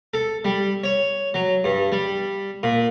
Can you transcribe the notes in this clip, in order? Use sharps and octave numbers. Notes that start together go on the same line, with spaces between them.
A4
G3
C#5
F#3
G2
G3
A#2